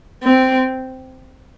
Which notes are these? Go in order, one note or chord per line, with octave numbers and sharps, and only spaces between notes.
C4